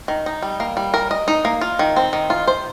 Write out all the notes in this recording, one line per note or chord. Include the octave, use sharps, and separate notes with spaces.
D#3
D#4
G3
A#3
G3
A#4
D#5
D#4
A#3
F4
D#3
C4
D#3
F4
C5